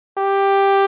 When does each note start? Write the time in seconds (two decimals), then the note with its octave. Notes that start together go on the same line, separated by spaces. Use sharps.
0.18 G4